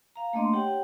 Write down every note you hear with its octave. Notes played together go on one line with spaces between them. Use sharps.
F5 A#5
A3 A#3 D4 D#5 C6
G4 C#5 F#5 G5